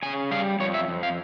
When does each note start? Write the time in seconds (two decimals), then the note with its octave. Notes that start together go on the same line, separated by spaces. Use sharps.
0.03 C#3 G#5
0.31 G3 F5
0.60 F2 C#5
0.74 E5
0.88 F2
1.03 F5